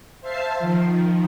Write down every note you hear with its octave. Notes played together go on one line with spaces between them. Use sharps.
C5 E5 F5 A5 C7
D#3 F3